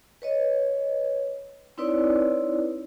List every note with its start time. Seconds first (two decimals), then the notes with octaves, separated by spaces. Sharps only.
0.22 B4 C#5 D#5
1.78 C4 D#4 E4 B4 C#5 D5